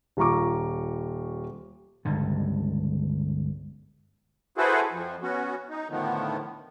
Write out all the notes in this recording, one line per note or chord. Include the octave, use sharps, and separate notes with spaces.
D#1 F4 A#5 C#6 D6
G1 C#2 G2 D3
E4 F#4 G#4 A4 B4 C5
F2 F3
B3 C#4 F#4
D#4
A2 D3 D#3 F3 B3